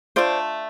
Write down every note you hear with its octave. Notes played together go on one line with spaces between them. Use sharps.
A3 D4 F4 C5 D5